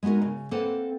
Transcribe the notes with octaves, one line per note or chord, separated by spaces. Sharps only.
G#3 B3 D#4 F#4 A#4
C#3
A#3 C4 A4 B4 C5 F#5